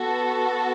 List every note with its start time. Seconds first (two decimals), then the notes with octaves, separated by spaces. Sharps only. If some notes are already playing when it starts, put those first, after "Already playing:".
Already playing: B3 F#4 A4